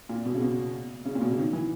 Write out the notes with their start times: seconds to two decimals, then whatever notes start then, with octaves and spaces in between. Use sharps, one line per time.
0.09 A#2
0.26 B2
0.35 C#3
0.41 B2
1.05 C#3
1.15 A#2
1.22 B2
1.30 C#3
1.38 D#3
1.53 E3